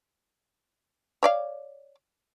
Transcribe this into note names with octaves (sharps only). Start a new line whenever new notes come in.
C#5 D5 F5